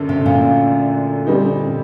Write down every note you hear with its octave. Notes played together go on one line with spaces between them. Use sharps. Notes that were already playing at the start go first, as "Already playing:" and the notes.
Already playing: F#2 D3 A3
C3
A#2
D3 G3 C4 D#4